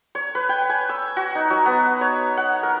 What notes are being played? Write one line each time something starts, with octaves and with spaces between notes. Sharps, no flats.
C#5
B4
G5
G#5
E6
F#4
D#4
F#3
B3
C#5
F#5
A#4